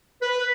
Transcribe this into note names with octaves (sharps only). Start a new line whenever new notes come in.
B4